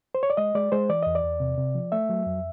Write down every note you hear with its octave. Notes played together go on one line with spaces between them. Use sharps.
C5
C#5
D5
G#3 D#5
G#3 D5
G#3 C5
E3 D5
E2 D#5
D5
E2
C3
C3
F3
A3 E5
F#3
F2